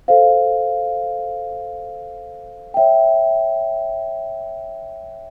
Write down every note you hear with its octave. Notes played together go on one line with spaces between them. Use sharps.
A4 C5 F5
C#5 E5 G5